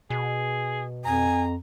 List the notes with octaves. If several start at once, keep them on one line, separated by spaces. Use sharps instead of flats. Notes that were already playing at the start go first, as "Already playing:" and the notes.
B2 G#4
F2 G#5 A#5